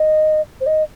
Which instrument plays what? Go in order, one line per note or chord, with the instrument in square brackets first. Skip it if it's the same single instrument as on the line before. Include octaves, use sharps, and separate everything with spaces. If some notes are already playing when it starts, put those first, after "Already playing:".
Already playing: [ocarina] D#5
C5
D#5